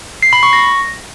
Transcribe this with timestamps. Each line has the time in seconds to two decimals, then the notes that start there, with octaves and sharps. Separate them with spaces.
0.23 C7
0.33 B5
0.43 C#6
0.53 A#6